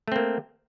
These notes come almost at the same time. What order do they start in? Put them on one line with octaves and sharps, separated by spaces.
A3 C4 A#3